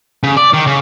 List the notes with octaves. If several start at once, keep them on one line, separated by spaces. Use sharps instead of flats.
C#3
D5
D#3
C#3